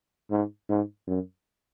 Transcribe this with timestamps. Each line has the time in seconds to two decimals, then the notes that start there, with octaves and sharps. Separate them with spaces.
0.31 G#2
0.69 G#2
1.07 F#2